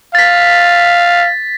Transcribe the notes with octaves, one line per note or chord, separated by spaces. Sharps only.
F5 A6 B6